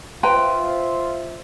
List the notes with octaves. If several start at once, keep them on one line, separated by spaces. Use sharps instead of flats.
F4 B4 C5 E5 G5 A#5 C6